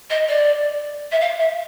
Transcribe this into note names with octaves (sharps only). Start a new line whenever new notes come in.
D#5
D5
E5
F5
E5